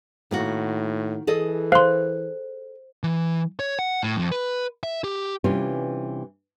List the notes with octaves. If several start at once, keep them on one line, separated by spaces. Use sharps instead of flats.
A2 D#3 A#3 F#4
E3 G#4 A4 D#5
C5 F5 C6
E3
C#5
F#5
A2
F2
B4
E5
G4
C3 E3 G3 C#4 D4 F4